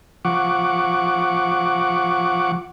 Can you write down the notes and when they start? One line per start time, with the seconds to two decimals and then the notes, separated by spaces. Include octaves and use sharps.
0.25 F3 F#5 C#6 D6